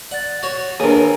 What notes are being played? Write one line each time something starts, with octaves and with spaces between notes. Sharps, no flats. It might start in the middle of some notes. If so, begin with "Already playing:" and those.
D5 F#5 A6
F#4 C#5
D#2 D4 G#4 A#4 B4 C#5